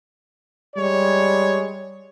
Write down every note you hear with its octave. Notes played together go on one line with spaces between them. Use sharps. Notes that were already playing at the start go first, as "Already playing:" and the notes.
G3 G#3 C#5